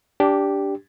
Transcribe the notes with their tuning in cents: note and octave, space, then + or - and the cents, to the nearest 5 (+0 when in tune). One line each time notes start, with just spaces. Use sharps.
D4 -15 G4 +0